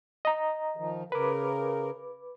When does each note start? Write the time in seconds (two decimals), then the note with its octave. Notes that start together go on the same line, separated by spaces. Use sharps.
0.25 D#5 A#5
0.76 D#3 F3
1.12 C#3 A#4 B4 D6